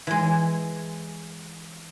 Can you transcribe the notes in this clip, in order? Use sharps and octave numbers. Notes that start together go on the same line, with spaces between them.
E3 G#3